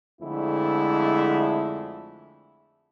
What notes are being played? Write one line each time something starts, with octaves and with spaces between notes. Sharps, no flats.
F2 D3 G#3 A3 E4